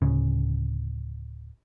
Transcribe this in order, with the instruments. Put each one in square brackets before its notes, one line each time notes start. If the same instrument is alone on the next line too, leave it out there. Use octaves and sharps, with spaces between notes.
[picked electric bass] D1 C#3